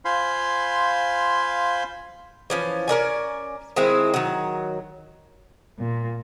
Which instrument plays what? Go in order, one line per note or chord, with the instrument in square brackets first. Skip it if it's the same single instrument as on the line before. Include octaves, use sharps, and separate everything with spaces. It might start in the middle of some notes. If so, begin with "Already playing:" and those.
[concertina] F4 C5 F5 G#5 B5 C6
[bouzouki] E3 F3 C#4
C#4 A#4 D5 G#5
D#3 G#3 C4 E4
D#3 F#3
[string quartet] A#2